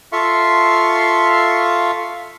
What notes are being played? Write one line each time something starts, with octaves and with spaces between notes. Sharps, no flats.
F4 A4 E5 F5 C6 C#6